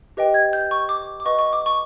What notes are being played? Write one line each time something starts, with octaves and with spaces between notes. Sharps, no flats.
G4 B4 D#5 G5
G#6
G6
C#6
D6
D6
B4 D#5 F#5 C#6
C#6
D6
C#6